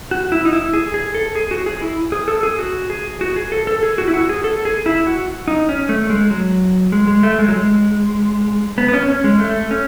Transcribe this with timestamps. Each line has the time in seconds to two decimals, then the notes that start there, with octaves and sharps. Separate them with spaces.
0.11 F#4
0.32 E4
0.45 D#4
0.53 E4
0.73 G#4
0.94 G#4
1.15 A4
1.35 G#4
1.51 F#4
1.66 G#4
1.82 E4
2.12 G#4
2.28 A4
2.43 G#4
2.59 F#4
2.90 G#4
3.21 F#4
3.36 G#4
3.52 A4
3.67 A4
3.83 G#4
3.98 F#4
4.08 E4
4.14 F#4
4.29 G#4
4.44 A4
4.65 G#4
4.86 E4
5.07 F#4
5.48 D#4
5.69 C#4
5.89 A3
6.10 G#3
6.30 F#3
6.92 G#3
7.07 G#3
7.23 A3
7.39 G#3
7.48 F#3
7.54 G#3
8.78 B3
8.88 B3
8.93 C#4
9.08 C#4
9.24 G#3
9.40 A3
9.71 C#4